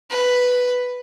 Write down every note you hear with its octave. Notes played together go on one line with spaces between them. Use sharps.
B4